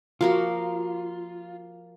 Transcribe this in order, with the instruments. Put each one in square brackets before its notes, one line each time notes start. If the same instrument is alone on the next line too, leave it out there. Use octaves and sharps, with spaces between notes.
[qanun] F3 A#3 F#4 [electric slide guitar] F4